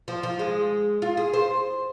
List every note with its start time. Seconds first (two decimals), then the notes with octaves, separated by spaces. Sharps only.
0.08 F3
0.23 F3
0.39 G#3
1.02 F4
1.17 G#4
1.33 C5